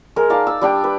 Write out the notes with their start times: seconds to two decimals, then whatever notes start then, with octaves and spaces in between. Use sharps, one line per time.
0.16 G#3 A#4
0.30 D#4 D5 F5 A5
0.47 E6
0.61 G3 D4 G5
0.84 B4